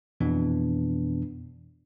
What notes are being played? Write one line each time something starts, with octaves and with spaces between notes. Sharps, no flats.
F2 B2 E3 B3 D4